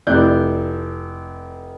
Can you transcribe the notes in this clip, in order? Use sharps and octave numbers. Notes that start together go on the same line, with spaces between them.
F1 E4 D5 F#6 G6